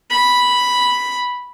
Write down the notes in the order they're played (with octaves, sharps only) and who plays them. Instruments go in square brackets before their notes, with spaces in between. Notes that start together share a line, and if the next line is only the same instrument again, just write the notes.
[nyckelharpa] B5